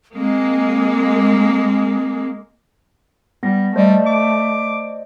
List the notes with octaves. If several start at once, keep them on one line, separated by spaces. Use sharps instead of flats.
G#3 A#3 C4
G3 B3 A#6
G3 A3 C5 D5 D#5
D6